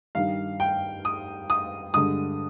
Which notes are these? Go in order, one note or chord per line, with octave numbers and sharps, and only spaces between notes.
G2 D#3 G3 F5
G5
D#6
D#6
G2 D3 G#3 D#6